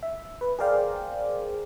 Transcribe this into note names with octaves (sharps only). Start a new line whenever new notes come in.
E5
B4
G#4 A#4 C5 D5 F5 G5